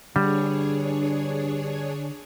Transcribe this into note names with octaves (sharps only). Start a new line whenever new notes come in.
G2 D3 G3 D4 G#4 C#5